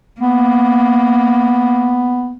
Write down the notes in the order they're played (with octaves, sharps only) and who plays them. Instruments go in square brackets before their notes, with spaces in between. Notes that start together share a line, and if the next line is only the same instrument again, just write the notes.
[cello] A#3 [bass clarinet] B3